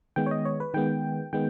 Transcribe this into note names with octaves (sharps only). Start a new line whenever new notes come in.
D#3 G#3 B3 G5
C#5
D#5
C#5
B4
D#3 G#3 B3 G5
D#3 G#3 B3 G5